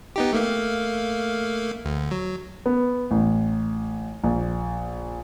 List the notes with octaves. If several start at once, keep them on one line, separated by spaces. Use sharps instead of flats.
B3 D#4 G4
A3 A#3 F5
D2
F#3
B3
A1
A#1